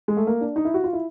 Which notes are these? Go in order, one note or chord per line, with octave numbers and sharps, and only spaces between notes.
G#3
A3
A#3
D4
D#4
E4
F#4
F4
E4